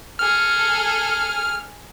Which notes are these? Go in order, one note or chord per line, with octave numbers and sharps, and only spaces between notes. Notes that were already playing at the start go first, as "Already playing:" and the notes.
G#4 A4 F6